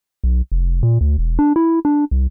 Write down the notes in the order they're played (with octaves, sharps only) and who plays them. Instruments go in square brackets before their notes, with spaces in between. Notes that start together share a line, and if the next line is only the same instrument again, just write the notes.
[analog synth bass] B1
F1
A#2
D2
E1
D4
E4
D4
C2